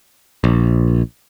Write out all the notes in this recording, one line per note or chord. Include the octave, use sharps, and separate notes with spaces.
A#1